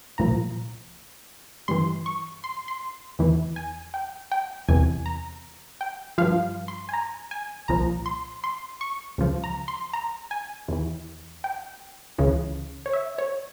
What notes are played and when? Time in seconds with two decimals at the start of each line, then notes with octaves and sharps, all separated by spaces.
0.18 C2 A#2 F3 A#5
1.68 G2 E3 C6
2.06 C#6
2.44 C6
2.68 C6
3.19 E2 E3
3.56 G#5
3.94 G5
4.32 G5
4.68 E2 C3 E3 G#5
5.06 A#5
5.81 G5
6.18 G2 F3 F5
6.68 C6
6.89 G#5
6.93 A#5
7.31 G#5
7.68 C2 A#2 F3 A#5
8.06 C6
8.44 C6
8.81 C#6
9.18 C#2 C#3 F3
9.44 A#5
9.68 C6
9.93 A#5
10.31 G#5
10.68 E2 E3
11.44 G5
12.18 C#2 C#3 E3
12.86 C#5
12.93 E5
13.18 C#5